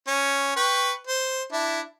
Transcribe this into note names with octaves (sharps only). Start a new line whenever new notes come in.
C#4
B4 G5 C#6
C5
D4 E4